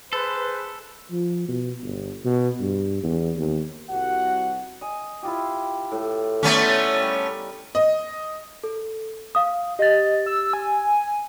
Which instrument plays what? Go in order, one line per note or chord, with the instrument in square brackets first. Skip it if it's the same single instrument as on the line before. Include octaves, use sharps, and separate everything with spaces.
[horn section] G#4 B4 [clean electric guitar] A4 [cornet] C5
[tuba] F3
B2
G1
B2
G2
E2
D#2
[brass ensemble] C2 F#4 F#5
[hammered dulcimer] D#5 G#5
E4 F4 G4
A2
[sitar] A3 B3 C#4 [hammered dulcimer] D5 C6
[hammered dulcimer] G3 A#4
[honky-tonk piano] D#5
[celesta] A4
F5 D#6
[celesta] G4 A6 [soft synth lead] D#5
[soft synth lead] E6
G#5